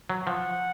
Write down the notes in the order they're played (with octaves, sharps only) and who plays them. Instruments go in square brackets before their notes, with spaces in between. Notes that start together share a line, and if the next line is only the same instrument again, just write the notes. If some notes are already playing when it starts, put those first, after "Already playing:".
[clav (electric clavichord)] F#3
[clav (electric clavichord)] F3 [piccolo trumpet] F#5